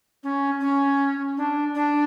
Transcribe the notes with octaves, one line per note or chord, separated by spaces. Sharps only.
C#4
C#4
D4
D4